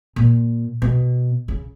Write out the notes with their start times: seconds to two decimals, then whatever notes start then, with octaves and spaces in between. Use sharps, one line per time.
0.16 A#2
0.82 B2
1.48 C#3